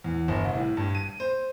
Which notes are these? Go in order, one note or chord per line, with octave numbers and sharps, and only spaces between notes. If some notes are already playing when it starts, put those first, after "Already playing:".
E2
G1
C2
A2
G2
D#7
C5